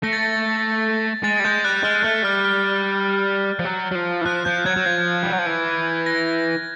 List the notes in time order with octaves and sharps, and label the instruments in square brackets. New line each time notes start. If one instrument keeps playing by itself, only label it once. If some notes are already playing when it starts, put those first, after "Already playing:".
[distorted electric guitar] A3 [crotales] A#6
[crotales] A6
A#6
[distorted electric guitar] G#3 [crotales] A6
[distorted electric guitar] G3
[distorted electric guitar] G#3 [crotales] G6
[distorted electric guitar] G3 [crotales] F#6
[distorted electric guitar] G#3 [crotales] F6
[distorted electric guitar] A3 [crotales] F#6
[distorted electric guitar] G3 [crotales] F6
[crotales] F6
[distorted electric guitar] F3
F#3
F#3
F3
E3
[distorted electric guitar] F3 [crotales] F#6
[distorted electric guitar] F3 [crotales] G6
[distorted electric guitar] F#3 [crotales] G#6
[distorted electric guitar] F#3
[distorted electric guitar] F3 [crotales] G#6
[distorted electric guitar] G3
F#3
F3
E3
[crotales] A#6